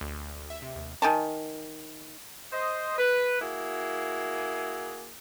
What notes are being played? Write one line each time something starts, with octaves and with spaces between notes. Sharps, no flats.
D2
E5
C3
D#2
D#3 G#5 A5
C5 D#5
B4
A#3 E4 F#4 G#4